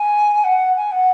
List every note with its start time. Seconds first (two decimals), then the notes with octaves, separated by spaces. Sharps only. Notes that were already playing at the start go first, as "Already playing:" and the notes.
Already playing: G#5
0.44 F#5
0.75 G#5
0.91 F#5